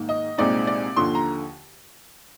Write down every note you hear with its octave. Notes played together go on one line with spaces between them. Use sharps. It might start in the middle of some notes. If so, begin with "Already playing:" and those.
Already playing: G#2 D#3 A#3
D#5
C2 A#2 G#3 C4 D#4 D5
D5
D#2 D3 F3 C6
A#5